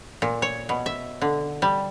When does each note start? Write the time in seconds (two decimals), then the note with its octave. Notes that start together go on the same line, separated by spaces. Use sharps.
0.22 A#2
0.42 C#5
0.69 B2
0.86 E5
1.22 D3
1.62 G3